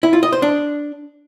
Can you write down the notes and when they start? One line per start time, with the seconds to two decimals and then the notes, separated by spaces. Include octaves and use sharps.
0.03 E4
0.13 F4
0.23 D#5
0.32 C5
0.42 D4